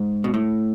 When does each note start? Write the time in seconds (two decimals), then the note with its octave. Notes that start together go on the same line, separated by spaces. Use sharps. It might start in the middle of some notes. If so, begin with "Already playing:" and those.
Already playing: G#2
0.24 B2
0.34 A2